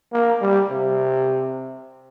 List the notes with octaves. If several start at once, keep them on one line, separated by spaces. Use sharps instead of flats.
A#3
G3
C3